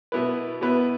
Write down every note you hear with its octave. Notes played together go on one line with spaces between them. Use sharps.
B2 B3 E4 B4
B2 B3 E4 B4